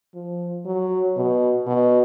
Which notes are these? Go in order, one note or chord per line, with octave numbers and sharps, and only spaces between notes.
F3
F#3
B2
B2